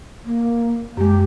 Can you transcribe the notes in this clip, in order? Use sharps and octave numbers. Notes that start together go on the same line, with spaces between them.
A#3
F#2 G#3 G4